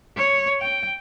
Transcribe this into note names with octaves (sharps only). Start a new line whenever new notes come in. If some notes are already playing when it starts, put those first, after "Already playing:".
C#5
G5